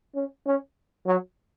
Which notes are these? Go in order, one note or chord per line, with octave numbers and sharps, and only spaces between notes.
C#4
C#4
F#3